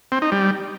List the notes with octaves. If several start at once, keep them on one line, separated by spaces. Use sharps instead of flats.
C4
D#4
G3